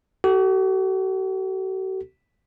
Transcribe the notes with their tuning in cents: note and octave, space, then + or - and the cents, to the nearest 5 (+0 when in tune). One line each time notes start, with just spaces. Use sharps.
F#4 +45 A4 +5